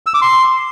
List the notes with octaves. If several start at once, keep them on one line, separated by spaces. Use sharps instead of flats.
E6
D6
C6